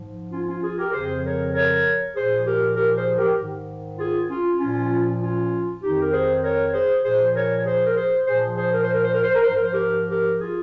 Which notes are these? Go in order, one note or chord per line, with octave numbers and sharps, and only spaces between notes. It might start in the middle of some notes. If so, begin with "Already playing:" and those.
Already playing: G#2 F3
C#4 F4
C#4 F4
F4 G#4
G4 A#4
F2 C#3 F3 G#4 C5
A#4 C#5
A#4 C#5
A#2 F3 G#4 C5
G4 A#4
G4 A#4
G#4 C5
G4 A#4
G#2 D#3
F4 G#4
C#4 F4
A#2 F3 C#4 F4
C#4 F4
F2 D#3 D#4 G4
A#4
G#4 C5
A#4 C#5
G#4 C5
A#2 F3 G#4 C5
A#4 C#5
G#4 C5
A#4
G#4 C5
A#2 F3 G#4 C5
G#4 C5
A#4
C5
A#4
C5
A#4
C5
A#4
C5
G#2 F3 A#4
C5
G4 A#4
G4 A#4
F4 G#4